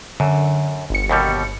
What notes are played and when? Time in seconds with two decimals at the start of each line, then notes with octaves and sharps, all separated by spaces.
0.20 F#2 D3
0.90 G1 C#7
1.10 D#2 B2 G3